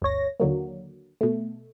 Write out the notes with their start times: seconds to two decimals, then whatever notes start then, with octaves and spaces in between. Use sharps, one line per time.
0.02 G1 D2 C#5 A#6
0.40 D#2 D3 F#3 A#3
1.21 B2 A3